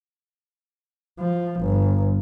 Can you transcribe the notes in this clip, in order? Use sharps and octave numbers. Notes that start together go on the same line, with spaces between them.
F3
G1